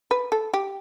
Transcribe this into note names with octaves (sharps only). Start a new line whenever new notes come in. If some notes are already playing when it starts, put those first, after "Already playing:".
B4
A4
G4